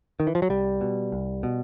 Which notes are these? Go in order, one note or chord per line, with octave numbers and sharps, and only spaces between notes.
D#3
E3
F3
F#3
C2 G3
B2
C2
B2